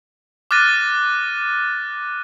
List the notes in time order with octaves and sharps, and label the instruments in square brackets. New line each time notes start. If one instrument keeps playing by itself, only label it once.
[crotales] D6 F6 F#6 A6 A#6 D#7